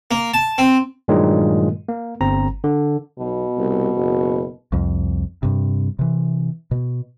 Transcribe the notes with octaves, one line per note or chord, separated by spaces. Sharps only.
A#3
A5
C4
G2 A#2 D#3 F#3 G#3
A#3
G1 C4 A#5
D3
B1 B2
C2
F#1
C2 F2
G2 C3
C3 E3
B2